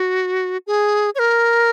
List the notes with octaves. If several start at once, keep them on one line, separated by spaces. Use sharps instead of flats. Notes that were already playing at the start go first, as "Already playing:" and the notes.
Already playing: F#4
G#4
C#5
A#4